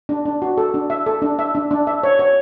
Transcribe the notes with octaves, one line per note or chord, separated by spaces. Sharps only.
D4
D4
F#4
A4
D4
E5
A4
D4
E5
D4
D4
E5
C#5
C#5